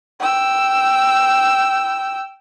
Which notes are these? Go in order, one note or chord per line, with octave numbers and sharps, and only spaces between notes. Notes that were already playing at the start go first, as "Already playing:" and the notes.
G5 E6